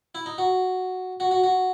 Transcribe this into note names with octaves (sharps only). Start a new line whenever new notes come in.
E4
D#4
F#4
F#4
F#4
F#4